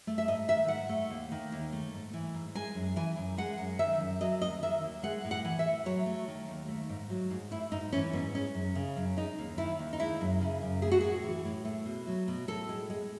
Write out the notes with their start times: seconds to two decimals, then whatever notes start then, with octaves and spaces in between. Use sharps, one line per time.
0.07 A3
0.18 E5
0.27 G#2 D#5
0.48 D#3 E5
0.68 G#2 F#5
0.89 A3
1.10 D#2
1.32 D#3
1.52 D#2
1.72 A3
1.94 G#2
2.13 E3
2.34 G#2
2.55 G#3 G#5
2.75 F#2
2.96 E3 G#5
3.17 F#2
3.38 G#3 F#5
3.58 F#2
3.79 D#3 E5
4.00 F#2
4.21 F#3 D#5
4.41 D#2 D#5
4.62 D#3 E5
4.83 D#2
5.03 G#3 F#5
5.25 A2
5.31 F#5
5.45 E3
5.59 E5
5.65 A2
5.86 F#3 C#5
6.06 A3
6.28 D#3
6.48 D#2
6.68 A3
6.89 G#2
7.10 F#3
7.30 G#2
7.51 A3 E4
7.72 G#2 D#4
7.92 E3 C#4
8.13 G#2 B3
8.34 G#3 C#4
8.54 F#2
8.75 C#3
8.96 F#2
9.17 G#3 D#4
9.38 D#2
9.58 D#3 E4
9.79 D#2
9.93 D#4
9.99 G#3 E4
10.21 F#2
10.41 C#3
10.62 F#2
10.82 A3 G#4
10.91 F#4
11.01 A2 G#4
11.24 E3
11.45 A2
11.65 A3
11.85 B2
12.07 F#3
12.28 B2
12.48 A2 A4
12.69 G#3
12.90 G#3